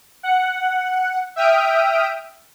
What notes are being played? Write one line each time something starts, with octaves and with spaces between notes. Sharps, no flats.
F#5
E5 G5 D#6 F6 D7